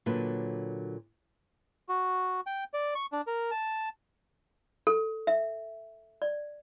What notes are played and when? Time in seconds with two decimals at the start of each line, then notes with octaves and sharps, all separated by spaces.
0.06 A#2 D3 F#3 B4
1.89 F#4
2.47 G5
2.74 D5
2.95 C#6
3.12 D4
3.27 A#4
3.51 A5
4.87 A4
5.27 E5
6.22 D5